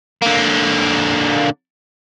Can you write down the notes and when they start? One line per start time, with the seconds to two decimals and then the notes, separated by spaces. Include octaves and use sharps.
0.22 D3 A#3